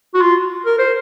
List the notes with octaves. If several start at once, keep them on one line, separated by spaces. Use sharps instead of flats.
F#4
F4
A#4
C5